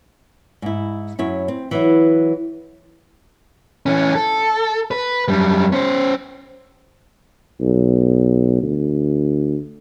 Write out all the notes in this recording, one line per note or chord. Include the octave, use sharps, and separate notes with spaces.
G#2 E4
F#2 E4 C#5
C4
E3 F#3 E4
E3 C#4
A4
B4
F#2 G3
C#4 C5
B1
D2